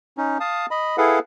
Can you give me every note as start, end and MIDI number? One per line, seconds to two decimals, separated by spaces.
0.18 0.38 61
0.18 0.38 63
0.40 0.66 77
0.40 0.66 81
0.40 0.66 87
0.71 0.96 75
0.71 0.96 83
0.98 1.19 64
0.98 1.19 68
0.98 1.19 69
0.98 1.19 71
0.98 1.19 77
0.98 1.19 78